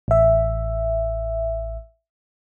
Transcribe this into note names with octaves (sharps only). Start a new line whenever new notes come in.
A1 E5